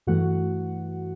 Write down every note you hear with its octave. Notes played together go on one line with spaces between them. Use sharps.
G2 E3 A3 F#4 F#5